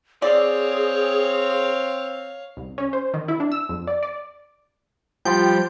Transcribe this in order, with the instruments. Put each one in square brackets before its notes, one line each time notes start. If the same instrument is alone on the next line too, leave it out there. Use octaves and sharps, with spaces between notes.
[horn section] C4 [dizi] G#4 [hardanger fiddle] C#5 F5 [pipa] D5
[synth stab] C2
C#4
C5
D#3
E4
D4
E6
F2
D5
D5
[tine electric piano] F3 [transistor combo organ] G3 [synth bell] G5 C6